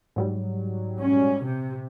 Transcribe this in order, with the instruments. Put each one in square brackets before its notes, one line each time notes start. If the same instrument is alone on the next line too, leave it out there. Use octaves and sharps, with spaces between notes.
[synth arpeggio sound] G#2 F#3 G3
[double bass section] C#4
C3